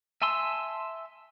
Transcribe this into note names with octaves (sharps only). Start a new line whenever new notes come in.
E5 G#5 A5 C6 E6